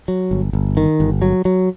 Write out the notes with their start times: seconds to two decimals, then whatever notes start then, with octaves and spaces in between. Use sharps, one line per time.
0.08 F#3
0.31 G1
0.53 G1
0.77 D#3
1.00 G1
1.22 F#3
1.45 F#3